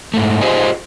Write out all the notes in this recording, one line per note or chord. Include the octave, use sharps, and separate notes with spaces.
G#2 A3
F4 G4 G#4 C5 D#5 G#5